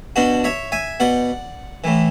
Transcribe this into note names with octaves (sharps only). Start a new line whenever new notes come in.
B2 D4 F#4
C#5 E5
E5 G#5
B2 D5 F#5
A2 E3